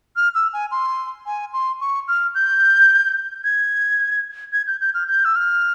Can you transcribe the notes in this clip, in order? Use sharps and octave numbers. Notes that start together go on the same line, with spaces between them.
F6
E6
G#5
C6
G#5
C6
C#6
F6
G6
G#6
G#6
G6
G6
F6
G6
E6
F6